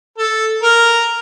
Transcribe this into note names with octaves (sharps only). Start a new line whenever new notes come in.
A4
A#4